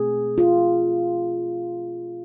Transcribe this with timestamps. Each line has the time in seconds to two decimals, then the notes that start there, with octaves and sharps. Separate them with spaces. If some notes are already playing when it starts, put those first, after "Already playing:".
Already playing: B2 A3 C4 G#4
0.38 F4